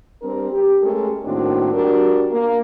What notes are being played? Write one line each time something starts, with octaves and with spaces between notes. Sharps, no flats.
G3 C4 D4 A#4
G4
G#3 A3 C#4 G4 A4 A#4
A2 D#3 A#3 C4 D4 F#4
G3 D4 F#4 A#4
A#3